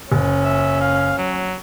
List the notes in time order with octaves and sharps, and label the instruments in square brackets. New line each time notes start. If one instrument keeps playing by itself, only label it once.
[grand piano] F#1 [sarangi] C#4
[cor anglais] E5
F5
F#3